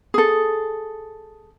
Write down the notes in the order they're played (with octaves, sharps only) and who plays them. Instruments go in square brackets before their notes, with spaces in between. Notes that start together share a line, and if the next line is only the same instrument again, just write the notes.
[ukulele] G#4 A4